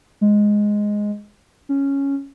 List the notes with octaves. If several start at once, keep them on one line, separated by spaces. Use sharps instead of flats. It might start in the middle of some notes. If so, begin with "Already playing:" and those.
G#3
C#4